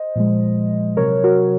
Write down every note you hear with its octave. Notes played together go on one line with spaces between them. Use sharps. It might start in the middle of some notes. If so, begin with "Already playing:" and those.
Already playing: C5 D#5
A#2 F3 G#3
C3 F#3 A#4 C#5
F#4 A#4